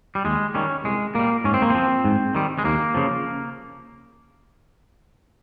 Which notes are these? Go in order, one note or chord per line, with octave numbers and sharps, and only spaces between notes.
G3
D#2 G#3
D#3 G3 C#4
C2 G#3
A#2 G3 A#3
G#2 C#4
C4
A#3
F3 C4
G#2
D#3 G3
G#3
D#2 A#3
C#3 F3